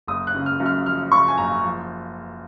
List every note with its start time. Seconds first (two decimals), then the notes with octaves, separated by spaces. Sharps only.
0.07 F#1 D#6
0.27 F#6
0.34 C#3
0.46 F6
0.60 F#2
0.66 F6
0.85 F3 F6
1.11 C#3 C#6
1.28 G#5
1.38 F#1 A#5
1.63 F3